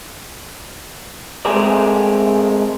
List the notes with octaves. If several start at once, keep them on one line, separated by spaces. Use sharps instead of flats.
G#3 A3 C4 G#4 A#4 D5